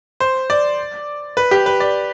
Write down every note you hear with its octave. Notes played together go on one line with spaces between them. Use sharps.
C5
D5
B4
G4
B4
D5